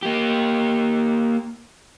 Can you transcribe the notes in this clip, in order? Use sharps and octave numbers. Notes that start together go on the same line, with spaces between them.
A#3 G4